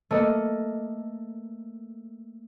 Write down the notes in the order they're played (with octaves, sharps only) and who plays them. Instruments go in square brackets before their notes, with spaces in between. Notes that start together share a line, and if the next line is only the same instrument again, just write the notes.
[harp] A3 A#3 D#5